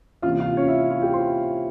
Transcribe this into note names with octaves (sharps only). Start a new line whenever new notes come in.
C3 E3 A#3 C#4 F4 F5
F4 F5
C#4 C#5
E4 E5
F4 F5
G4 G5
C5 C6